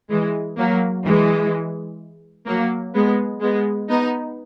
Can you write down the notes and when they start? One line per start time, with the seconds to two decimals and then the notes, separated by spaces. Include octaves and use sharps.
0.10 E3 G#3
0.58 F#3 A#3
1.05 E3 G#3
2.47 F#3 A#3
2.95 G#3 B3
3.42 G#3 B3
3.89 B3 D#4